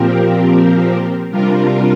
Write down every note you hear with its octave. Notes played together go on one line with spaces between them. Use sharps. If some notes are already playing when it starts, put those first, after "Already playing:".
Already playing: A#2 F3 C4 G4 A#4
C3 G3 D4 F4 A#4